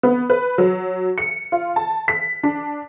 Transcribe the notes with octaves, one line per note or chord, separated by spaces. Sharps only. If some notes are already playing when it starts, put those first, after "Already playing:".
B3
B4
F#3
C#7
F4
A5
B6
D4